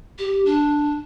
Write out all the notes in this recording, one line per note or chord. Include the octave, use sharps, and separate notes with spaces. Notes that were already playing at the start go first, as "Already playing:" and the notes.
G4
D4